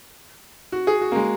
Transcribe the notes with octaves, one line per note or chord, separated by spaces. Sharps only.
F#4
G#4
F#4
A#3
G#3